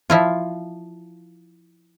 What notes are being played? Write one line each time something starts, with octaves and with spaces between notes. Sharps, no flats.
F3 E4 F4